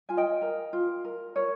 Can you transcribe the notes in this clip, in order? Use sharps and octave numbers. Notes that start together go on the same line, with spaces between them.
F4 G#5
D#5 G5
A#4
F4
A#4
A#4 C#5